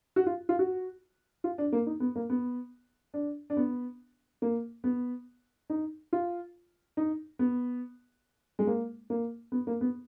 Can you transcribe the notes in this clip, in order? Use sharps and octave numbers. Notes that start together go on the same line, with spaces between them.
F#4
F4
F4
F#4
F4
D4
A#3
D#4
B3
A#3
B3
D4
D4
B3
A#3
B3
D#4
F4
D#4
B3
G#3
A#3
A#3
B3
A#3
B3